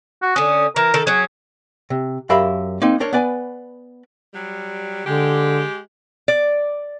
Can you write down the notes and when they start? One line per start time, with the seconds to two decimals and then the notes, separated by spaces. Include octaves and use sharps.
0.22 F#4
0.36 D3 C#4 D#6
0.76 E3 A#4
0.94 D#3 A4
1.07 F#3 C#4 G#4
1.90 C3
2.30 F#2 G4 A#4 E5 F5 B5
2.82 A#3 C4 D#4
3.00 D4 A#4 C5 C#5
3.13 B3 B4 D5 G#5
4.34 F#3 G3
5.06 D3 G#3 G4
6.28 D5